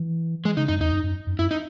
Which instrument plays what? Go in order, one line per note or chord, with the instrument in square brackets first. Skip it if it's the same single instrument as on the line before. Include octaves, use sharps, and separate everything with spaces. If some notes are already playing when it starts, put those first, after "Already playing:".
Already playing: [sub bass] E3
[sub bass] E3 [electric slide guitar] G#3
[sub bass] C#3 [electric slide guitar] D#4
[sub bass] F#2 [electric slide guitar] D#4
[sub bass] E2 [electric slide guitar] D#4
[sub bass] F#2
F#2
F#2
[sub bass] F#2 [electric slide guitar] E4
[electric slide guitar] D#4